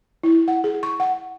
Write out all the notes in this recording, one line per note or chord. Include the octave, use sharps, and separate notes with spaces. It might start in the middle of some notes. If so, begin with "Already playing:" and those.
E4
F#5
G#4
C#6
F#5